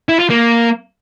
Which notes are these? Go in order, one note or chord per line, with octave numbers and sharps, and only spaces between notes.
E4
F4
A#3